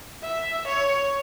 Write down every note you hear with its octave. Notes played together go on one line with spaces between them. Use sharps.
E5
C#5